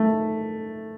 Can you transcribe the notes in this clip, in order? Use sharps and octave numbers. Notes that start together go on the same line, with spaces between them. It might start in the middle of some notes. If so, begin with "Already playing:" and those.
Already playing: A3